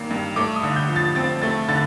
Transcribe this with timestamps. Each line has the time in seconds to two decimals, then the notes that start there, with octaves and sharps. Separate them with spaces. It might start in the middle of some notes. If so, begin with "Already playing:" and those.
Already playing: G2 D#3 A#3
0.11 G2
0.36 A3 D6
0.56 D#6
0.63 D3
0.76 G6
0.89 F3
0.96 A6
1.15 C4 A6
1.42 A3 A6
1.69 D3 A6